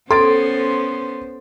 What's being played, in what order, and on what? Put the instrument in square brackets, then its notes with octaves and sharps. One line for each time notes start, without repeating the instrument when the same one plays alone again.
[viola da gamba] B3 C#4 C5 [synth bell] A4 [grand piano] C6 A6 D7